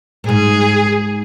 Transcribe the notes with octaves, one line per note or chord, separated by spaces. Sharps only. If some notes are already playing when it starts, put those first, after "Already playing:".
A#2
G#2 G#4